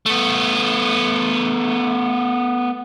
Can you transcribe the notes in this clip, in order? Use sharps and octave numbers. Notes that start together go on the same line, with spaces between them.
A3 B3